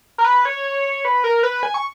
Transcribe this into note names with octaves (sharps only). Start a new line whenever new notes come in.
A#4
B4
C#5
B4
A#4
B4
G#5
C#6